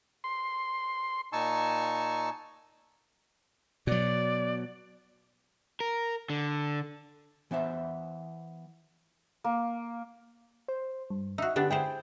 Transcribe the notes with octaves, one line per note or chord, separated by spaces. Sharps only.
C6
A#2 D#4 G#5 A5 C#6 E6
B2 F#3 D5
A#4
D3
E3 B3 C5 E5
A#3
C5
G2
D#4 F#4 E5
D3 B3 D4 G4
E4 G#4 C5 G5